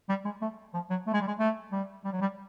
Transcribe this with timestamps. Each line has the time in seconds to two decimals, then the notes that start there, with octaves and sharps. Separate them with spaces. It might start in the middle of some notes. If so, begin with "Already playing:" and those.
0.09 G3
0.25 G#3
0.42 A3
0.74 F3
0.90 F#3
1.07 A3
1.13 G#3
1.21 G3
1.27 G#3
1.39 A3
1.72 G3
2.04 G3
2.12 F#3
2.21 G3